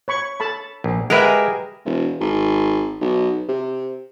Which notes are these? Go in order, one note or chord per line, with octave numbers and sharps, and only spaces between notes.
C#5 B5 C#6
A4 A5 B5
A#1
G#3 G4 G#4 A#4 B4 E5 F#5
E1
G#1
B1
C3